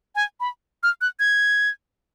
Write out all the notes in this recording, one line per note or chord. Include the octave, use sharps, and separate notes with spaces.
G#5
B5
F6
F#6
G#6